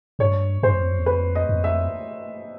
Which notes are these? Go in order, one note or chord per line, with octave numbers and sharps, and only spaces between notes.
G2 C#5
G2 C5
F#2
F2
F#2
E2
F2 B4
D#5
F2
E5